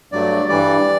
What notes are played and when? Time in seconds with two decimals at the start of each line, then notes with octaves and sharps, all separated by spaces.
0.12 G2 F#3 A3 D5
0.48 G2 E3 G3 D5